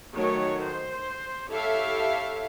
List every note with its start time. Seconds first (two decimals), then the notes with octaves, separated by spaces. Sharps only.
0.14 D#3 F#3 A3 C#5
0.66 C5
1.50 E4 G4 A4 C#5 E5 F5